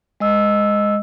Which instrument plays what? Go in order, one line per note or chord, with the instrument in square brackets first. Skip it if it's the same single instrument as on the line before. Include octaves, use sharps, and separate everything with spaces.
[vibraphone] G#3 D#5 E6